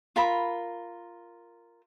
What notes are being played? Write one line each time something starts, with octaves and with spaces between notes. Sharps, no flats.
F4 A#4 B5